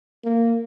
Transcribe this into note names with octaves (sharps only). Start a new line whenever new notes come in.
A#3